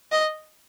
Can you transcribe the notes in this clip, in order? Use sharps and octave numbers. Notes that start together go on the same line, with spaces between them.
D#5